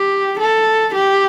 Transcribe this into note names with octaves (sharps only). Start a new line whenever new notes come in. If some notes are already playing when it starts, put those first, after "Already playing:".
Already playing: G4
A4
G4